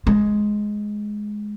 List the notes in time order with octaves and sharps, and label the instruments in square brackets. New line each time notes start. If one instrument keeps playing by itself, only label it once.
[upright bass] G#3